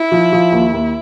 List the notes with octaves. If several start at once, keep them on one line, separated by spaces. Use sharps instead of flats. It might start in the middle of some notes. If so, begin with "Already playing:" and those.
Already playing: E4
F3
F3
D#2
D#2